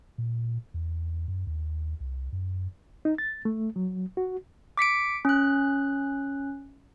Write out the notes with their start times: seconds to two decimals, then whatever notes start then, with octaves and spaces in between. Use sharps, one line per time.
0.18 A#2
0.74 E2
1.28 F#2
1.47 D#2
2.00 C2
2.32 F#2
3.05 D#4
3.18 A6
3.45 A3
3.76 F#3
4.17 F#4
4.77 D6 B6 C#7 D7
5.25 C#4 F#6